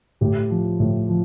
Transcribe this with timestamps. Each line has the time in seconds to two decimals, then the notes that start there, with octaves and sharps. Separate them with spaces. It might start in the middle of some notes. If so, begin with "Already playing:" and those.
0.21 A2 G4
0.50 F3
0.80 A2
1.09 F3